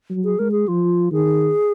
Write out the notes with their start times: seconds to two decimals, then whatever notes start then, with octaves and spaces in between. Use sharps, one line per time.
0.10 F#3
0.24 G#4
0.39 G#3 A#4
0.52 G#4
0.68 F3 F4
1.11 D#3 G#4